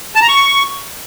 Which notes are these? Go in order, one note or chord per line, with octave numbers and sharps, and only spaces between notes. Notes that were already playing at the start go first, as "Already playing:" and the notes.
A5
A#5
C#6